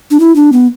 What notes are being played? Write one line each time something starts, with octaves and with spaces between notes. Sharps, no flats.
D4
E4
D4
B3